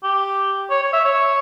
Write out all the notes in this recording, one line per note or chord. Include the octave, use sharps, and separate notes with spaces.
G4
C#5
C#5
E5
C#5